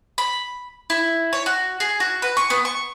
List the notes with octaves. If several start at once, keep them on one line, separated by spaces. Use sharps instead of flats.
B5
E4
C#5
F#4
G#4
F#4
B4
C#6
B3
C#6